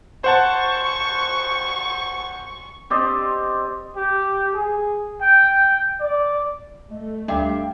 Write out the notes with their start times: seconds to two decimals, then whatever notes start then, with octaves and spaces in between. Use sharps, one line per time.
0.24 C5 F#5 A5 C#6
2.90 C4 G4 D5 D#5
3.96 G4
4.54 G#4
5.21 G5
6.00 D5
6.91 A3 D#5
7.28 D2 G2 G3 E5 F5 G5